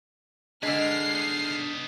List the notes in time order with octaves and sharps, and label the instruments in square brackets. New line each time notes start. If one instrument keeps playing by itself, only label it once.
[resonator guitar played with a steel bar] D3 G#3 [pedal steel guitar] D4 [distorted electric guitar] B4 D5 [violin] F6 C7
[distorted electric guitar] B3 D#4